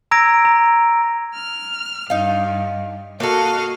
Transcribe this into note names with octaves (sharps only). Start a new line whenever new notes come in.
A#5 E6 G#6 A#6 D7
A#5
F6
G2 D#4 F5
A#3 F#4 A4 D#5 F5